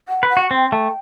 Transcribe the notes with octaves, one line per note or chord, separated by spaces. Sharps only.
F#5
B4
F#5
F#4
C4 G5
A3